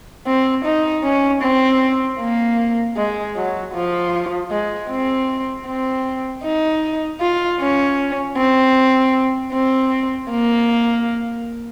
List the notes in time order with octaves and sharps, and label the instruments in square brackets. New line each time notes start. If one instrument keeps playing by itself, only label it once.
[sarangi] C4
D#4
C#4
C4
A#3
G#3
F#3
F3
G#3
C4
C4
D#4
F4
C#4
C4
C4
A#3